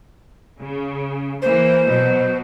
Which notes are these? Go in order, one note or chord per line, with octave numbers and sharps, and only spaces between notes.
C#3
E3 A#3 C5
B2 F#3